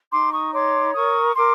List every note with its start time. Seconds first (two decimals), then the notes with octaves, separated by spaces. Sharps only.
0.11 D#4 C6 D6
0.32 C#6 D#6
0.53 C#5 C6 D6
0.94 A#4 C#6 D#6
1.35 A#4 C6 D6